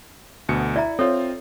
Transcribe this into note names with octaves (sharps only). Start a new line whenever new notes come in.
D2 B2 C#7
E4 D5 E5 A#5
C4 F4 A4 C#5